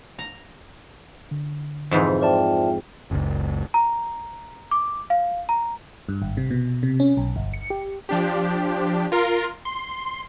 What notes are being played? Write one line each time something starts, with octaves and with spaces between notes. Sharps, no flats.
A#5
D3
F2 G#2 E3
F4 C5 D5 E5 G5 A5
F#1 C#2
A#5
D6
F5
A#5
G2
G#1
C3
B2
C3
C#4
B1
G1
C#7
G4
F3 D4 G4
F4 A#4 C6
C6